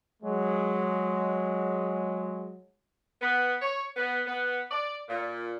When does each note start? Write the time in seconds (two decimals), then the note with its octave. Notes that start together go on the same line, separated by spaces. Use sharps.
0.23 F#3 G#3
3.22 B3
3.61 C#5
3.97 B3
4.27 B3
4.71 D5
5.09 A#2